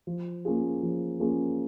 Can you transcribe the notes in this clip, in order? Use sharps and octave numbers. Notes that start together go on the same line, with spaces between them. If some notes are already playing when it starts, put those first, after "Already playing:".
F3
A#3 C#4 F4 G#4
F3
A#3 C#4 F4 G#4